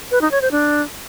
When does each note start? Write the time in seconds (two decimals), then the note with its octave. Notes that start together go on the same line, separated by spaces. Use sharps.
0.11 B4
0.21 D#4
0.31 C#5
0.42 C5
0.52 D4